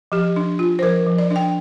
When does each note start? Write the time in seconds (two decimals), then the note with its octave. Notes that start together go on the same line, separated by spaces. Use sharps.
0.12 F3 G4
0.36 D4
0.59 F4
0.79 C5
0.82 F3 A#4
1.06 F3
1.18 D5
1.31 D4
1.36 G5